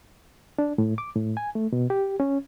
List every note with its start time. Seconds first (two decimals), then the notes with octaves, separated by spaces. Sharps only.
0.59 D4
0.78 A2
0.98 D6
1.15 A2
1.37 G#5
1.55 A3
1.72 B2
1.90 G4
2.20 C#4